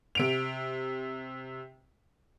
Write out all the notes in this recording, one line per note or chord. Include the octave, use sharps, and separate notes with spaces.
C3 D7 F7